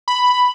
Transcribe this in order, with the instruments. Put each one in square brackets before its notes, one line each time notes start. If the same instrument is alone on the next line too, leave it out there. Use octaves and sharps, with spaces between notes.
[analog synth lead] B5